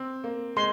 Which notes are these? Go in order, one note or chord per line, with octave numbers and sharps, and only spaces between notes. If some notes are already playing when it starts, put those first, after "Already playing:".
Already playing: C4
A#3
G#3 C6